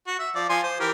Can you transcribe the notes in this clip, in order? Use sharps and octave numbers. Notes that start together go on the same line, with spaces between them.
F#4
E5
F3 D5
F3 G#5 C6
C5
E3 G4 A#4